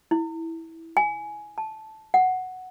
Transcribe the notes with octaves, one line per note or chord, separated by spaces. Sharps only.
E4
G#5
A5
F#5